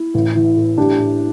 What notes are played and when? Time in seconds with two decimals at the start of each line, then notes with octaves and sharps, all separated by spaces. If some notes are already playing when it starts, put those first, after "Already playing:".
Already playing: E4
0.14 A1
0.35 E3
0.57 A2
0.77 A1 D4 G4
0.99 A2